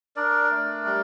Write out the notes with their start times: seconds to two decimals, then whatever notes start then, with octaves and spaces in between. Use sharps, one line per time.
0.16 D4 A#4 D5
0.51 A3
0.85 G3